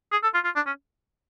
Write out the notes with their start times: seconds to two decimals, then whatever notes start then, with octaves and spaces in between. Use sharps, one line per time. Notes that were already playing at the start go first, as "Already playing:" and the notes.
0.12 G#4
0.23 A4
0.34 F4
0.45 F4
0.56 D4
0.67 C#4